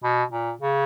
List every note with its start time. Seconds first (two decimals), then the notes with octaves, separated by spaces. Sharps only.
0.04 B2
0.32 A#2
0.61 C#3